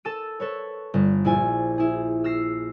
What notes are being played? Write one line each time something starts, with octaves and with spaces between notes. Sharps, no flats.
A4 A5 E6 D#7
A4 B4 C#5
G1
A#1 E4 F4 G#5
E4 G#4
E6 F6 A#6 C7